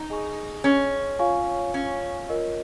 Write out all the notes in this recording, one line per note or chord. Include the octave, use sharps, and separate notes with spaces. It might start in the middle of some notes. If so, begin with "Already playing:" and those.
Already playing: D#4
G#4 D#5 G#5 C#6
C#4
F4 C#5 F5 G#5 C#6
C#4
F4 A#4 D#5